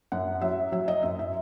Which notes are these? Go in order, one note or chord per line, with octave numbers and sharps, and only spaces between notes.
F#2 F#5
F#3 E5
F#3 E5
D#5
F#2 E5
E5